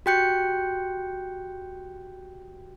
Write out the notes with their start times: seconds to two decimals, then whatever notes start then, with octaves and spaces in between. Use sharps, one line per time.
0.06 F#4 G4 G5 F#6 G6 C#7